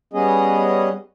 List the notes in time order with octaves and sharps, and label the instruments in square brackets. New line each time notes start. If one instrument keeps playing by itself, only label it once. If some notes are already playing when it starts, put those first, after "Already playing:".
[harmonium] G3 B3 C#4 G#4 D#5